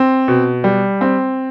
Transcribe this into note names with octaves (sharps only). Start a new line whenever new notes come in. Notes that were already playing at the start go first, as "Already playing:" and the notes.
Already playing: C4
B2
G3
C4